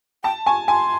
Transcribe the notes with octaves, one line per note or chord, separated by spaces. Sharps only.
G5 A5
G#5 C#6
G#5 C6